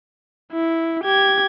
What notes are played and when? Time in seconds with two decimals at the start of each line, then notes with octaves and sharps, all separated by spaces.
0.52 E4
1.04 G4 G#6